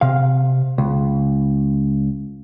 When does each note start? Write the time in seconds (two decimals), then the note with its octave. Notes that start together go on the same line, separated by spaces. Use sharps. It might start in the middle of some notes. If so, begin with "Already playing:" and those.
0.01 C3 F5
0.78 C#2